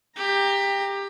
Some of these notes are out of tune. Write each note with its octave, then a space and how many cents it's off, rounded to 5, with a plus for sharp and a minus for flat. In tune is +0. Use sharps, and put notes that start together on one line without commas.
G4 +20 A#5 +0